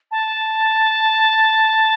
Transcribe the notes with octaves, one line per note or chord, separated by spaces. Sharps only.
A5